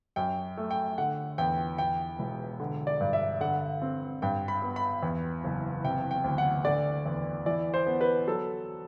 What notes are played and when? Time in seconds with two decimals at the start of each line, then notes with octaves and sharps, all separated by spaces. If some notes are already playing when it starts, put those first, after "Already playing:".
0.16 F#2 G5
0.57 A3
0.71 G5
0.98 D3 F#5
1.38 E2 G5
1.78 E2 G5
2.19 E1
2.60 D3
2.87 D5
3.01 G2
3.13 E5
3.41 D3 F#5
3.82 C4
4.22 G2 G5
4.48 B5
4.62 B3
4.76 B5
5.03 E2
5.44 F#1
5.84 C3 G5
6.11 G5
6.24 D2
6.38 F#5
6.65 D3 D5
7.06 E2
7.46 E3 D5
7.74 C5
7.86 B3
8.01 B4
8.27 F#3 A4